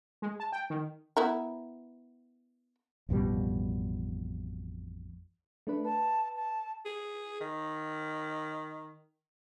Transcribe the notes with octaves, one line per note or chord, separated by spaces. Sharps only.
G#3
A5
G5
D#3
B3 E4 A#4
A1 F2 B2 G3
A3 D4 B4
B4 A5
A5
G#4
D#3